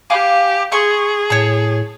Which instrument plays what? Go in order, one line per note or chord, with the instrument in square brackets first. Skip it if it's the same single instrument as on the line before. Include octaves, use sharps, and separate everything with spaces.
[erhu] G4 [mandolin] F5 G#5 D6
[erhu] G#4 [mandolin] C6 C#6
[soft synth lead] A2 [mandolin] C#5 A5